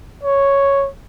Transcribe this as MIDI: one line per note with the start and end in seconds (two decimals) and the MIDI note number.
0.23 0.88 73